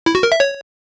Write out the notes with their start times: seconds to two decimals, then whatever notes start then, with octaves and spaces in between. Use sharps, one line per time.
0.06 E4
0.15 F#4
0.23 A#4
0.32 E5
0.40 C#5